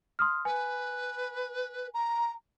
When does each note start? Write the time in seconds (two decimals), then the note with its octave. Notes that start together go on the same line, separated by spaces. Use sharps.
0.19 C6 D#6 F6
0.45 B4 G#5
1.94 A#5